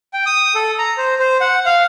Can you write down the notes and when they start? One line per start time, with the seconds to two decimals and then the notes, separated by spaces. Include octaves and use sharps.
0.13 G5
0.26 D#6
0.55 A4
0.78 A#5
0.97 C5
1.19 C5
1.41 F#5
1.66 F5